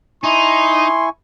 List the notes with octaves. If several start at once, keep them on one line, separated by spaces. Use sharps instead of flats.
D#4 E4 G#5 C6 C#6